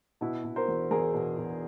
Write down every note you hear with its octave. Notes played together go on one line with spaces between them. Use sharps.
B2 E4 F#4
B2
A#4 C5
E2
E2 G#4 A#4
B2
B2